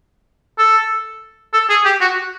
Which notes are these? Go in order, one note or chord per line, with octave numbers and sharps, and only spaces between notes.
A4
A4
G#4
G4
F#4